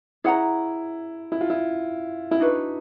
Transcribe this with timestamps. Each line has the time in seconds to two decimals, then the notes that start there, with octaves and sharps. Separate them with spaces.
0.24 E4 G#4 C#5 F#5 A#5
1.32 E4
1.41 F4
1.50 E4
2.31 E4
2.40 D4 D#4 F#4 B4